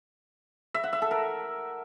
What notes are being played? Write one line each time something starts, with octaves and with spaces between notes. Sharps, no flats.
E5
F#5
E5
A4
A#4